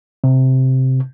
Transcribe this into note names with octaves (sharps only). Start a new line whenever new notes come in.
C3